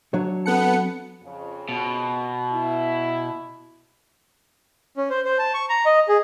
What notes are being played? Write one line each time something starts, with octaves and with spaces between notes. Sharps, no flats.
F#3 D4 C#5
B3 C4 A4 F#5 A5 C#7
F2 C#3
B2
E4
C#4
C5
C5
A5
C#6
A#5
D#5
G#4